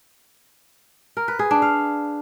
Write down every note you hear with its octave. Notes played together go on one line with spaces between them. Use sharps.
A#4
B4
G#4
D4
F5